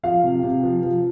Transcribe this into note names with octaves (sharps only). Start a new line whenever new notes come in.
F3 F5
C3
C3
F3
F3